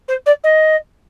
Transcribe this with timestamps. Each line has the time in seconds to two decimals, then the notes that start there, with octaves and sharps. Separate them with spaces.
0.08 C5
0.26 D5
0.43 D#5